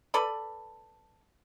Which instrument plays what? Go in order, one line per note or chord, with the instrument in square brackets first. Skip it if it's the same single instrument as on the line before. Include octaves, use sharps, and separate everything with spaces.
[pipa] A4 B4 D5 B5